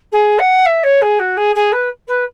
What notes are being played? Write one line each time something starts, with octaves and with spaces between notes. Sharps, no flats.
G#4
F#5
E5
C#5
G#4
F#4
G#4
G#4
B4
B4